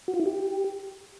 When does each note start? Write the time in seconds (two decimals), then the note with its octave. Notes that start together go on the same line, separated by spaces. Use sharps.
0.08 F#4
0.14 F4
0.20 E4
0.26 G4